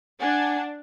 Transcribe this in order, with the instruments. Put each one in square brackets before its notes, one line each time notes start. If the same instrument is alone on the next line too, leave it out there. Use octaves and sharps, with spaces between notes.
[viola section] D4 [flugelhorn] F#5 [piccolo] G#5